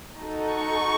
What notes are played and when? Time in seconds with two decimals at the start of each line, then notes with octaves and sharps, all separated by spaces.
0.18 D#4 F#4 A4
0.53 C#6